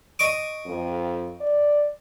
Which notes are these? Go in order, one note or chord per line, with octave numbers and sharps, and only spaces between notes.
D#5 C#6 D6
F2
D5